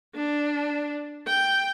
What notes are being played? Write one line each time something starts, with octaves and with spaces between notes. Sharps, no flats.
D4
G5